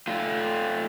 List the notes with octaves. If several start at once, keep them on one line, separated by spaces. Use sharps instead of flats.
A3 F4